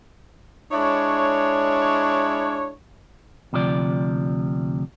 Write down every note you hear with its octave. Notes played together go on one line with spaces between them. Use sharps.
G#3 D4 E4 C#5
D2 C3 F3 D5